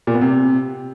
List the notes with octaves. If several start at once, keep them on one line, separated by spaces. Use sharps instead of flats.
A#2
B3
C3